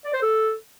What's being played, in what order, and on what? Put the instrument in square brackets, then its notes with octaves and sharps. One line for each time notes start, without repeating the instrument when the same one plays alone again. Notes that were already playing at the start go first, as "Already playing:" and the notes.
[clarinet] D5
C5
A4